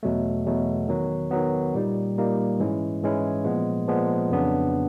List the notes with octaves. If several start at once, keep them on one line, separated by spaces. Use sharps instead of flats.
E2 B2 F#3 A3
E2 B2 F#3 A3
D#3 F#3 B3
D#3 F#3 B3
A#2 G3 A#3 D#4
A#2 G3 A#3 D#4
G#2 E3 G#3 C#4 E4
G#2 E3 G#3 C#4 E4
A#2 F3 G#3 B3
A#2 F3 G#3 B3
F2 C#3 F#3 B3 D4